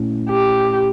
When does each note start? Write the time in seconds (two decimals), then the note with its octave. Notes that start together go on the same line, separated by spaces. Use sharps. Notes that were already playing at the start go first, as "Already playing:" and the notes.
Already playing: A#2 A3 C#4 E4
0.30 G4